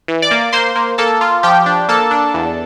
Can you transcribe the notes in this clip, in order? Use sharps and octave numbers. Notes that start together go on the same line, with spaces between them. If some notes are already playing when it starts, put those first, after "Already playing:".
E3
D5 D6
A#3
A#3 C5 C6
A#3
A#3 A4 A5
F4
F3 G4 G5
D4
A#3 A4 A5
D4
E2